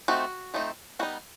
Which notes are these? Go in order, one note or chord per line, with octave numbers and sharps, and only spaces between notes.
F3 A3 C4 D#4 F#4
F3 A3 C4 D#4
G3 B3 D#4 F#4